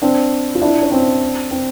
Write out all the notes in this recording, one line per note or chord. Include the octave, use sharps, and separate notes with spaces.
C4 D4
F4
D4 E4
C#4
C4 D4
C4